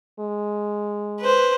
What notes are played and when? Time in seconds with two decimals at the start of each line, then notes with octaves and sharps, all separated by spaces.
0.20 G#3
1.20 B4 C5